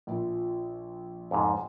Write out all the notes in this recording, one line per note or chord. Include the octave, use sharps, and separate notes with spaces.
A#1 F3
F2 G#2